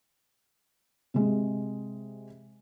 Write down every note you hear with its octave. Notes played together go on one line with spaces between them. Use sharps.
C3 G#3